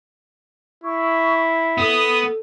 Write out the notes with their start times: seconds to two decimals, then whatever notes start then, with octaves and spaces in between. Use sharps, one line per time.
0.84 E4 C#6
1.78 B3 A4 D#6